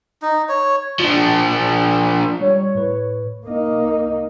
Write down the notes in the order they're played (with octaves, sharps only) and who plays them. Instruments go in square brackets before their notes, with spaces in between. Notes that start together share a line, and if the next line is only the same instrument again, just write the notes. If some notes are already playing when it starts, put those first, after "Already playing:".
[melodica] D#4
C#5
[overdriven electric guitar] F3 D4
[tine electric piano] G3 [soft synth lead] C#5
[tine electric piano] A2 B4
[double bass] A#3 D#4